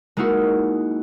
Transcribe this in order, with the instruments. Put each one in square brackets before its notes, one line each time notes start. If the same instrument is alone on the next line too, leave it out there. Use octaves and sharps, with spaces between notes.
[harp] G#3 A#3 D#4 E4 F#4